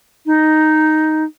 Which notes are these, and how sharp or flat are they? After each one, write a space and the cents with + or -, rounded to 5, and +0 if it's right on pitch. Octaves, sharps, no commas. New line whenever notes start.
D#4 +0